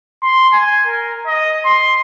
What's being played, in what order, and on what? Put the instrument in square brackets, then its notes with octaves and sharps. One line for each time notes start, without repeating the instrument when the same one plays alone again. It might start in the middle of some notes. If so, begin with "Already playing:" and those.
[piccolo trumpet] C6
G#5
A#4
D#5
C6